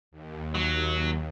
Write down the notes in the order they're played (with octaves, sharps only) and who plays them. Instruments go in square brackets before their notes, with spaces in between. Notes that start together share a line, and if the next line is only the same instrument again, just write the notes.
[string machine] D#2
[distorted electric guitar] F#3